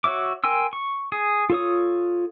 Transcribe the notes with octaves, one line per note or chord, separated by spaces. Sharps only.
F#4 C#5 E5 D6
A#4 G5 G#5 C6 E6
C#6
G#4
F4 A4 C#5 D#6